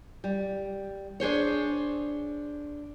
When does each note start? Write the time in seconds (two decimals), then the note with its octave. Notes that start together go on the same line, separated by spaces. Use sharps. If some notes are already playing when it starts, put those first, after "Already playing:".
0.24 G3
1.20 D4 G#4 C5 C#5